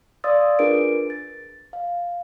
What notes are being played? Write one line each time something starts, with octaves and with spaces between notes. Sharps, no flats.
D5 F5 C6 D#6 E6 A6
D4 F4 G#4 A#4 B4 D7
A6
F5